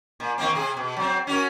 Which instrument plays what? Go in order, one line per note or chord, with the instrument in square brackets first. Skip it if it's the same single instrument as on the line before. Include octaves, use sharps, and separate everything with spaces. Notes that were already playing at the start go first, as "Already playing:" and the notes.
[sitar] A#2
D#3 A#3 C4
C3 G#4
B2
F#3 C4
C#4 F#4 A#4